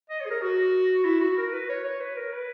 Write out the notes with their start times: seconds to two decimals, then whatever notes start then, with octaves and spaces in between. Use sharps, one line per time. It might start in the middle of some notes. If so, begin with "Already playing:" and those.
0.10 D#5
0.20 C#5
0.26 G#4
0.30 A#4
0.42 F#4
1.05 E4
1.21 F#4
1.38 A#4
1.53 B4
1.69 C#5
1.84 C#5
2.00 B4
2.16 A#4
2.32 B4